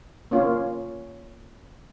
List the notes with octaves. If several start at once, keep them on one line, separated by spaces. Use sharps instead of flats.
A#3 C#4 F4